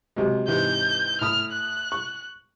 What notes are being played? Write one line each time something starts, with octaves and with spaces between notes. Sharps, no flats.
C3 F#3 G#3
G#2 C3 E3 G6
A2 B5 D#6 F6
F#6
C#6